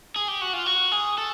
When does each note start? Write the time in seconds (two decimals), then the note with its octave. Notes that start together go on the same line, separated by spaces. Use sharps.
0.16 G#4
0.28 G4
0.42 F#4
0.54 F4
0.66 F#4
0.92 G#4
1.18 A4